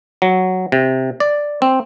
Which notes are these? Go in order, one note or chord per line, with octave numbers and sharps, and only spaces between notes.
F#3
C3
D5
C4